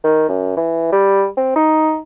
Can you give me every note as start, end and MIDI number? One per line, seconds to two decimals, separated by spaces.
0.04 0.27 51
0.29 0.52 42
0.57 0.88 52
0.92 1.27 55
1.37 1.55 60
1.56 1.98 63